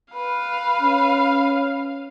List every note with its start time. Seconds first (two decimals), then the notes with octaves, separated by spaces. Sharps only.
0.14 B4 F5
0.81 C#4